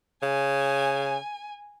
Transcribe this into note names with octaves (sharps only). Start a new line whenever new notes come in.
C#3 G#5